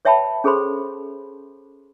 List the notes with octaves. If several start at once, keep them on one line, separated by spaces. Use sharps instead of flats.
B4 C#5 E5 G5 A5 B5
C#4 G#4 A4 C5 B5 C6